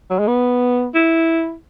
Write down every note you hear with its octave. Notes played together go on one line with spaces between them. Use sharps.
F#3
G#3
B3
E4